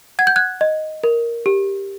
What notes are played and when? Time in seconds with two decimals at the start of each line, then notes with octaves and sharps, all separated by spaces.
0.19 F#5 G#6
0.27 G6
0.36 F#6 G#6
0.61 D#5
1.04 A#4
1.46 G4